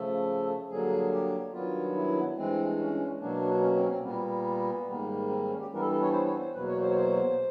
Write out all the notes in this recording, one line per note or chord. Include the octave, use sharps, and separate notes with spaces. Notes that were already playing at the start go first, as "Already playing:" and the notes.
Already playing: C#3 F3 A3 A4
G2 D3 F#3 A#3 G#4
G4
G2 D#3 F#3 B3 F4
E4
G2 E3 G#3 C4
C#4
B2 F#3 A#3 D4
C#4
C4
C#4
C4
A#2 G3 A#3 B3
G#2 D#3 G3 A#3
C4
C4
C#4
G4
G2 E3 G3 B3 A#4
A4
A4
C#5
C5
C#5
C5
E2 B2 F#3 A#3 B4
C#5
C5
C#5
C5